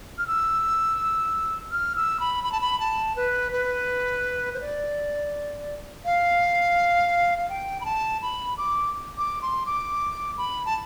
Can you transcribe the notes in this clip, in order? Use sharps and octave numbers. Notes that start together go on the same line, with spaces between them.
F6
E6
F6
E6
B5
B5
A5
B5
A5
B4
B4
C5
D5
F5
F5
G5
B5
A5
B5
D6
D6
C6
D6
B5
A5